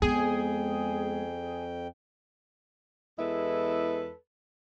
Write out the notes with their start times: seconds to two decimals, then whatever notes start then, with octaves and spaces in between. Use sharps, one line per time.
0.02 F2 G#3 B3 G#4 G5
3.19 E2 G#3 E4 A4 B4